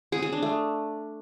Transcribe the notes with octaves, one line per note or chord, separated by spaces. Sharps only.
G#4
G#4
D4
A3